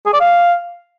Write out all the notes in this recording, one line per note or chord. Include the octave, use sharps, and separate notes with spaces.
G#4
D5
F5